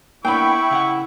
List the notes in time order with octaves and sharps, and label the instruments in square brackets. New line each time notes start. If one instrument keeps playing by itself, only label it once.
[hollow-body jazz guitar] A#3 B3 D4 [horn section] E4 [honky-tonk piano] G5 B5 [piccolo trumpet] C#6
[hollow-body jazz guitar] C#3 F5 F#5